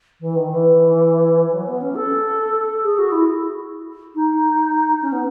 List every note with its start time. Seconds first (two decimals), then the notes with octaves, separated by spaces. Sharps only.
0.20 E3
0.36 D#3
0.50 E3
1.52 F#3
1.67 B3
1.81 C#4
1.95 A4
2.83 G#4
2.98 F#4
3.12 E4
4.15 D#4
5.02 C#4
5.12 B3